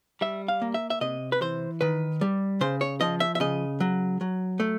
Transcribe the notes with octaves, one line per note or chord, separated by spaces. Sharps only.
G3 E5
F5
A#3
E5
E5
C3 D#5
B4
E3 C5
D#3 B4
G3
C#3 C5
C#5
F3 D#5
E5
E5
C#3 D#5
F#3
F#3
A3